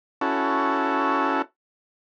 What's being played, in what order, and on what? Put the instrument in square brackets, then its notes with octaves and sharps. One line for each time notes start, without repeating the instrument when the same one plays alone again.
[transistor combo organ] C#4 E4 F#4 A4